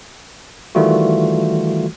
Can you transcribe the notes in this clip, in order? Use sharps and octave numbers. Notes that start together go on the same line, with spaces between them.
D#3 E3 G3 A3 F4 F#4